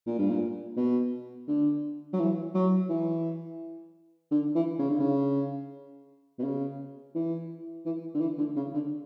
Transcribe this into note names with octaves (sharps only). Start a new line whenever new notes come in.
A#2
G2
A#2
B2
D3
F#3
E3
F#3
E3
D3
E3
C#3
D3
C#3
B2
C#3
E3
E3
D3
E3
D3
C#3
D3